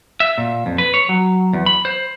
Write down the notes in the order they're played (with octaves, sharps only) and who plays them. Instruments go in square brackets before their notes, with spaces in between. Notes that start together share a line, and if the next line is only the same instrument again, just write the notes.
[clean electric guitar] E5
A#2
F2
B4
C#5
F#3
E2
B5
C5